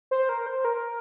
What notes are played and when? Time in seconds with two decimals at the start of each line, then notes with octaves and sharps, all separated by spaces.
0.11 C5
0.29 A#4
0.46 C5
0.65 A#4